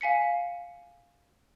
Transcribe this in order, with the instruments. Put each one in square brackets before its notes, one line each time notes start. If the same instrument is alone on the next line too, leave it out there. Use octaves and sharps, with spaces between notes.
[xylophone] F5 G#5 B6 C#7